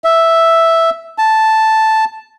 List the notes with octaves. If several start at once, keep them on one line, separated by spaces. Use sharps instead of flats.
E5
A5